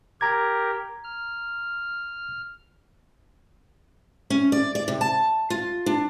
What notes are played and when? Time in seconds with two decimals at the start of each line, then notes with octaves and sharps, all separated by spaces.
0.21 G4 A#4 A#5 G#6
1.04 F6
4.30 C#4
4.52 D5
4.75 D5
4.88 C3
5.01 A5
5.50 F4
5.86 D4